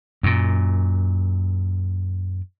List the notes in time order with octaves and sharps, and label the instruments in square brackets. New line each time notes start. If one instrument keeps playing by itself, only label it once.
[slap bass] F#2 A#2